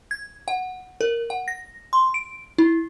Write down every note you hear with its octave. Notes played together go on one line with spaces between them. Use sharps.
G#6
F#5
A#4
F#5
A#6
C6
D7
E4